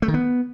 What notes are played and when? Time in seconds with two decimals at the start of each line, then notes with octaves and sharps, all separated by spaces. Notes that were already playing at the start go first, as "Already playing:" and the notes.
0.02 A3
0.08 D#3
0.14 B3